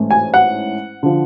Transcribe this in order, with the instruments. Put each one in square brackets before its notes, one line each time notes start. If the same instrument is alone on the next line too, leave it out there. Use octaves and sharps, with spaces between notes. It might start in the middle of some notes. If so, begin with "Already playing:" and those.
Already playing: [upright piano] A1 G#2 E3 A3 C#4
G#5
F#5
D3 F3